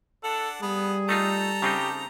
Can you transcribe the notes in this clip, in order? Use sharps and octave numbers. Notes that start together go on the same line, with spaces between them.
D4 A4 F#5
G3 B3 G#4 B4
A3 D#4 F4 A4 A#5
C#3 C4 D#4 G4